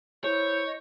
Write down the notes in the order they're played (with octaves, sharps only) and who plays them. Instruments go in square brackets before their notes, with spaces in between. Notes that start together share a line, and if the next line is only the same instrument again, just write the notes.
[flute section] E4 C5 G6 [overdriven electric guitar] C#5
[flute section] D#5